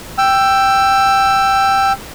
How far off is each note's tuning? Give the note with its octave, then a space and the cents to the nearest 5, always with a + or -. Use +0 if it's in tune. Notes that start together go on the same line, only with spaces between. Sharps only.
G5 +0 E6 +15